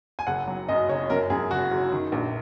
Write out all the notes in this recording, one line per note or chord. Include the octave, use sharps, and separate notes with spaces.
G#5
F#1 F#5
F#3
F#2 D#5
F#1 C#5
F#2 A#4
F#2 G#4
F#1 F#4
F#1
D#3
A#1